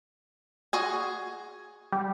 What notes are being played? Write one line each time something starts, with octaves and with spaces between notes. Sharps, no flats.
F#4 G#4 G#5
G3